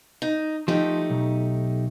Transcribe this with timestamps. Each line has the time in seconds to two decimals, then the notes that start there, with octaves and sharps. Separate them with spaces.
0.22 D#4
0.68 F3 A3 D#4 G4
1.10 B1